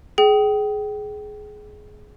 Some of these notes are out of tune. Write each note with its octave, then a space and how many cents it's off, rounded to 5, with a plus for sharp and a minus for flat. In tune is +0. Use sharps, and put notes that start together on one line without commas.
G#4 +15 G5 -25